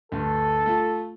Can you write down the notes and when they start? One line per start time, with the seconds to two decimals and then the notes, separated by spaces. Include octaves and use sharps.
0.12 D2 G2 A4
0.66 A3 F4